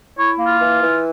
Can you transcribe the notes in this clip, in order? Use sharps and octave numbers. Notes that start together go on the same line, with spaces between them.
E4 C#5
A#3
F4
E3
E3